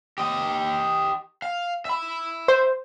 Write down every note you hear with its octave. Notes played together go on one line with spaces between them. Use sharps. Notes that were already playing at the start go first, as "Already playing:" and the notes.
G4 D#5
F5
E5 B5
C5